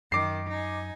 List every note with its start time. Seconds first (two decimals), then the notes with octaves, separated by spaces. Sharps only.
0.12 F#2 D#3 D6 C7
0.50 D#4 G#5